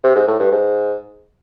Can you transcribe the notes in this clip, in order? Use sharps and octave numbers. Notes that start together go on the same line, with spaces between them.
C3
G#2
A2
G2
G#2